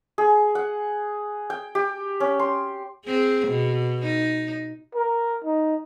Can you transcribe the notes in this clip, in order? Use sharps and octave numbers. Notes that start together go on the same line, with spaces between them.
G#4
F#5
G5
G4
C#4
C6
C4 G#4
B2
D#4
A#4
D#4